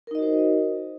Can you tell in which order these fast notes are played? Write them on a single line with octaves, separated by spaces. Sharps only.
A#4 D#4 D#5 F#4 C5